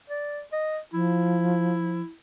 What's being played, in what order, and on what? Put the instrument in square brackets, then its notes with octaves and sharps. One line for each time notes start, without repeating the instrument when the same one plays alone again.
[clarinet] D5
D#5
[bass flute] F3 [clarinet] E4